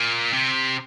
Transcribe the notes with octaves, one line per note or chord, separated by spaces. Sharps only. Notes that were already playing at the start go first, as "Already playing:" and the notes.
Already playing: A#2
C3